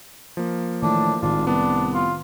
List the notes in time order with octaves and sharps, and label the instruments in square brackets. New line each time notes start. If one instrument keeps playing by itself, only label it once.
[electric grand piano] F3 A#3
[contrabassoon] A2 [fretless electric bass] D#3 E3 [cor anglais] D4
[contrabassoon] G#1 [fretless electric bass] A2 D#3 [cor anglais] D4 [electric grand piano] F4
[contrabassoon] C2 [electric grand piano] B3 [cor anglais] D4
[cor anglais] F4